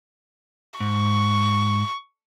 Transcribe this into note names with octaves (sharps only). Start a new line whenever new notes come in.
G#2 C#6